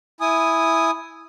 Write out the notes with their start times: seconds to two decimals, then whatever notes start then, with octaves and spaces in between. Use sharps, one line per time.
0.21 E4 G#5 D#6